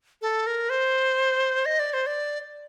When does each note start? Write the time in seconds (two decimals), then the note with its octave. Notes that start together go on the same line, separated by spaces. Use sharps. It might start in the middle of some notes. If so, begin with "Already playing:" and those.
0.22 A4
0.47 A#4
0.70 C5
1.66 D#5
1.79 D5
1.94 C5
2.06 D5